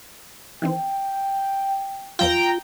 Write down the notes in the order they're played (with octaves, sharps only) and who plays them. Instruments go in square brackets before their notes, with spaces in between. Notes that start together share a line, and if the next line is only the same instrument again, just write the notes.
[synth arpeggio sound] D#3 E3 C4 [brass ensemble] G5
[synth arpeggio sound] E2 F3 E6 [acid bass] F4 [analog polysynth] G5 A#5